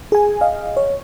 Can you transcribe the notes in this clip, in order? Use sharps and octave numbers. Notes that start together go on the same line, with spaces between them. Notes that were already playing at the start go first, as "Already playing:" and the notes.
G#4 G#5
D#5 F5
C#5